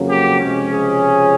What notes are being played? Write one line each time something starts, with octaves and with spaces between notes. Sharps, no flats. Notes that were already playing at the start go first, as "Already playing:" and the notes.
Already playing: F2 C#3 F#3 A#3 C#4
G4
C#2 C3 F3 G#3 C#4
G#4